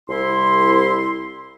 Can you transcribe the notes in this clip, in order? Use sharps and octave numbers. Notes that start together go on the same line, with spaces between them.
C2 E4 C6